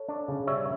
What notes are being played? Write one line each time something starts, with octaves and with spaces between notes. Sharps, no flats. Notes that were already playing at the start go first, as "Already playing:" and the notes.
Already playing: A4 C#5
D4
C#3
G3 C#5 E5